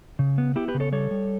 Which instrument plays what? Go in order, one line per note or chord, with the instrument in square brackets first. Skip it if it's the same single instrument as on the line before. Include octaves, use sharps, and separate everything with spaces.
[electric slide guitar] C#3
B3
B3 E4 G4
G4 B4
C#3
A4 C#5
G3 A4 C#5
G3